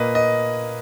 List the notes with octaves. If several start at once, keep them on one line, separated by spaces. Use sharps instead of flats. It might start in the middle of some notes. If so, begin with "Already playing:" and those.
Already playing: A#2 A#3 B4 D#5
D#5